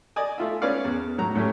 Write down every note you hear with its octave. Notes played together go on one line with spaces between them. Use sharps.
D5 D#5 G#5 D#6
A3 F4 E5
C#4 B4 D5 F5
E2
A2 F#3 A#5
A2 F#3 A3 C#4 G4